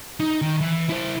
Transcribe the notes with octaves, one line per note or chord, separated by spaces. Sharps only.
D#4
D#3
E3
E4 C5